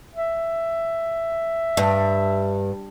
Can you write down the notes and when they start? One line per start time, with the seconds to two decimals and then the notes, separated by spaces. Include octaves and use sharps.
0.15 E5
1.77 G2